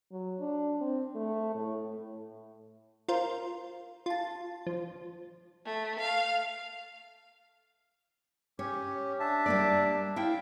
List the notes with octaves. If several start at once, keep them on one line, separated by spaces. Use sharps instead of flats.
F#3
D4
C4
A3
A2
A2
F4 A#4 C5
F4 A5
F3
A3
F5
C#4 G4 C#5
D4 E5 A5
G3 A#3 D5
E4 E5 F5 G5